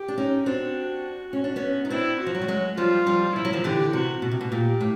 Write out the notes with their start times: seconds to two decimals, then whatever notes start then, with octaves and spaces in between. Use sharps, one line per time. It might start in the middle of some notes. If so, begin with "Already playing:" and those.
Already playing: G4
0.08 D4
0.18 C#4 D#4
0.46 C4 D4 F#4
1.33 C#4 F#4
1.44 D4
1.56 B3 C#4
1.85 D#4
1.90 C4 D4 E4
2.20 F#4
2.26 F3
2.35 F#3
2.42 G3
2.48 F#3 G#3
2.77 F3 G3 F4
3.06 F3 G3
3.35 F3 E4
3.45 F#3
3.53 D#3 F3
3.64 D3 E3 G4
3.93 C3 F#4
4.22 B2 F#4
4.31 C3
4.41 B2
4.51 A#2 G4
4.81 A2